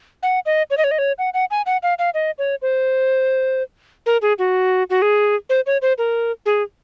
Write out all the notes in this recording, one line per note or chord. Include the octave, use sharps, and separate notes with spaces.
F#5
D#5
C#5
D#5
C#5
D#5
C#5
F#5
F#5
G#5
F#5
F5
F5
D#5
C#5
C5
A#4
G#4
F#4
F#4
G#4
C5
C#5
C5
A#4
G#4